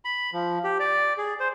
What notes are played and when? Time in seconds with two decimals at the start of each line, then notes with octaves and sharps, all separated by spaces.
0.05 B5
0.33 F3
0.64 G4
0.80 D5
1.18 G#4
1.40 C5